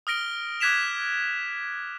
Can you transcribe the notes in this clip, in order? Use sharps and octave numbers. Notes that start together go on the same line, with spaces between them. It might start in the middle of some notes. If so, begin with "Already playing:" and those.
D#6 F6 A#6 D7 G7
D6 F#6 G#6 B6 E7 F7